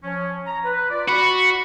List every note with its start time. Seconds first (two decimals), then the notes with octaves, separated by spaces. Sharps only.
0.03 F3 C#4
0.47 A#5
0.64 B4
0.89 F4 D5
1.08 F#4 B5